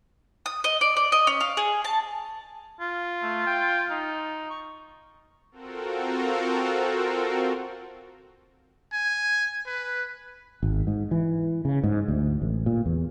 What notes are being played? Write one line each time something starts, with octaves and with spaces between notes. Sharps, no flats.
D#6
D#5
D5
D5
D#5
C#4
F5
G#4
A5
F4
A3
G5
D#4
C#6
C4 F4 F#4 A4 A#4
G#5
B4
G#1
G#2
E3
C#3
G#2
D2
A1
A#2
E2